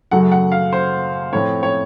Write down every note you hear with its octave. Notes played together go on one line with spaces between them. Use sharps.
F#2 C#3 F#3 A3 F#5
F#5
F5
C5
A2 F3 C4 C#5
C#5